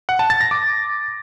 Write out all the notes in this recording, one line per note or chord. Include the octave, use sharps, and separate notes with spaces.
F#5
A5
A6
A#6
D6